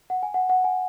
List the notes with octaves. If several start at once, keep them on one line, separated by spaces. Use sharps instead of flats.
F#5
G#5
F#5
F#5
G#5